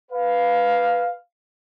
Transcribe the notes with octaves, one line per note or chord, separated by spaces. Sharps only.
B4 F5